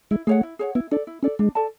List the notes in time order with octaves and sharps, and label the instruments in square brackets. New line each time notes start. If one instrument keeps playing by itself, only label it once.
[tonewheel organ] G#3 [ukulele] E4
[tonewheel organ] A3 [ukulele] G#4 C#5 F#5
[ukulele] E4
G#4 C#5 F#5
[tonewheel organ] B3 [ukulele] E4
[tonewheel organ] D4 [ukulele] A4 D5
[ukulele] E4
[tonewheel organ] C#4 [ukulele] A4 D5
[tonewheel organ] G#3 [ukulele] D4
[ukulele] A4 D5 A5